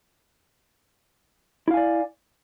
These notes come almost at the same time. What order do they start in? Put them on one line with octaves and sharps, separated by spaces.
E4 F5 G#5 D5